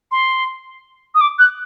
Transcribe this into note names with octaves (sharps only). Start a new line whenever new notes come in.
C6
D#6
D6
F#6